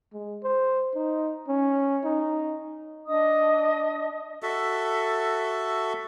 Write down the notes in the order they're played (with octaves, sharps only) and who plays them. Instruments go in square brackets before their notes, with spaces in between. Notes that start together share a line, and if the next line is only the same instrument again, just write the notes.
[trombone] G#3
C5
D#4
C#4
D#4
[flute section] D4 D#5 D#6
[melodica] F#4 A4 E5